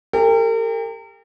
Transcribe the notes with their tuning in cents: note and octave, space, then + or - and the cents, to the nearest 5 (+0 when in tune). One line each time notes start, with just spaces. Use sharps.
G4 +35 A#4 -40